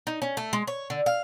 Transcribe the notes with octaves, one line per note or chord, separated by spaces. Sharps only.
D#4
C#4
A3
G#3
C#5
D3
F5